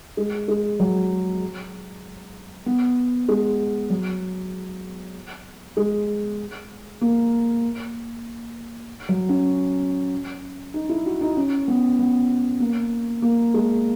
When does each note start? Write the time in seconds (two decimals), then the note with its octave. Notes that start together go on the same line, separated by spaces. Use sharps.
0.17 G#3
0.48 G#3
0.80 F#3
2.66 B3
3.28 G#3
3.90 F#3
5.77 G#3
7.01 A#3
9.09 F#3
9.29 C#4
10.74 D#4
10.89 E4
11.06 F#4
11.21 D#4
11.37 C#4
11.68 B3
11.99 B3
12.60 A#3
13.22 A#3
13.54 G#3